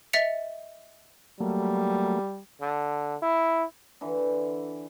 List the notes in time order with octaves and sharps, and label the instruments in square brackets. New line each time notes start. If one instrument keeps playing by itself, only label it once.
[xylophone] D#5 E5 A6 B6 C#7 F7
[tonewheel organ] F#3 A3 A#3 [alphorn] G3
[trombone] D3
E4
[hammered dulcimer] D3 E3